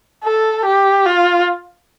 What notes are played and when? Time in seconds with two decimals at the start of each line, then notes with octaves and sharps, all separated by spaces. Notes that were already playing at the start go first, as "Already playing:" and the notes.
0.24 A4
0.65 G4
1.06 F4